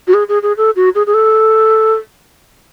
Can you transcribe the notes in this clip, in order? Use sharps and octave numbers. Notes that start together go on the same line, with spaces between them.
F#4
G#4
G#4
G#4
A4
F#4
G#4
G#4
A4